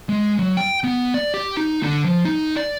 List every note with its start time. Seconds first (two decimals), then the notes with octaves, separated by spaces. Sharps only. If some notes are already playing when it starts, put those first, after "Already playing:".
0.09 G#3
0.39 F#3
0.57 G5
0.84 B3
1.14 D5
1.34 G4
1.57 D#4
1.83 D3
2.04 F3
2.25 D#4
2.56 D5